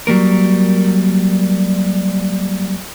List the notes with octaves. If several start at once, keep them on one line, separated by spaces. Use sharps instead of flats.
F#3 G3 A#3 A#4